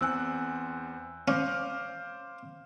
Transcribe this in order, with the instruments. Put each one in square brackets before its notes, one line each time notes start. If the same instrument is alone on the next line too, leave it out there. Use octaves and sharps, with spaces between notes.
[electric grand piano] E2 C4 F#6 [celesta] G#5 E6
[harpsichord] C#4 [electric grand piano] C5 D6 F6 [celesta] F5